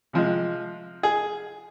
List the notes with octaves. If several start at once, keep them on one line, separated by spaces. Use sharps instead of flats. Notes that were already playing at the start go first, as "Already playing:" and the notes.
C3 F3 G#3
G#4